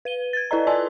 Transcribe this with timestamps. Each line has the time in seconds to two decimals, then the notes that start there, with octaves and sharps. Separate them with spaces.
0.05 B4 D#7 G7
0.33 G#6 A6
0.51 E4 A4 B4 D5 D#5 A#5
0.66 F4 D5 G#5 A5 C6 E6